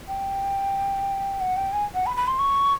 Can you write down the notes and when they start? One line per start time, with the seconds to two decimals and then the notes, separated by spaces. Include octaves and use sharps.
0.08 G5
1.40 F#5
1.57 G5
1.73 G#5
1.95 F#5
2.06 B5
2.17 B5
2.28 C6
2.39 C#6